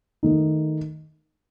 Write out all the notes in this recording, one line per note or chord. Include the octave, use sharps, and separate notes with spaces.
D#3 A3 D#4